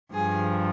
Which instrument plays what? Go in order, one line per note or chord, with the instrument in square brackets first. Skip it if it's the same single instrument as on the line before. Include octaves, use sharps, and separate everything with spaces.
[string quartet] G2 F3 G#4